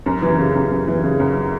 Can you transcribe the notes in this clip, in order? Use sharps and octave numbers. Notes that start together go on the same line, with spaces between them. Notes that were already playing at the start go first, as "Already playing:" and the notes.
F#2
E3
C#3
F#2
F#2
E3
C#3
F#2